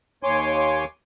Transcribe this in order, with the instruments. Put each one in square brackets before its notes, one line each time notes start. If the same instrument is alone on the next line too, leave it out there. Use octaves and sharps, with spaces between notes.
[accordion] D#2 C#5 G#5 C6 D6